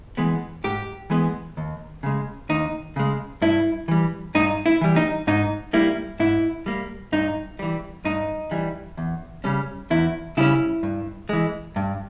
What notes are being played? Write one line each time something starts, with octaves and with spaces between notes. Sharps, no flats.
E3 G#3 B3
G#2 G4
E3 G#3 B3
D#2
C#3 G#3
D#2 D#4
C#3 G#3
G2 E4
E3 G3
G2 D#4
E4
E3 G3
D#4
G#2 D#4
G3 A#3 E4
G#2 E4
G3 A#3
G2 D#4
E3 G3
G2 D#4
E3 G3
E2
C#3 G3 C#4
E2 E4
C#3 G3 C#4 E4
G2
E3 G#3
G2